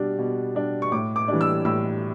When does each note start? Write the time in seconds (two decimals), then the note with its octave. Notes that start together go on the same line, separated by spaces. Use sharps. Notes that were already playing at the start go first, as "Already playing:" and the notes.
Already playing: B2 G3 D4
0.18 B2
0.55 G3 D4
0.82 C#6
0.92 A2 D6
1.16 D6
1.28 E3 G3 D4
1.41 E6
1.65 A2 E6